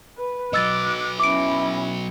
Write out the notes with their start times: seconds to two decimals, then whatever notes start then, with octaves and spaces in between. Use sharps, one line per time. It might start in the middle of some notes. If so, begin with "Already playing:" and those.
0.18 B4
0.53 F#3 B3 D#5 D6 E6 F#6 A6
1.20 C#4 E4 D6 D7